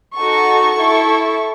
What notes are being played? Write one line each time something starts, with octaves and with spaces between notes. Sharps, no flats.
D#4 F#4 A4 C#6
E4 A4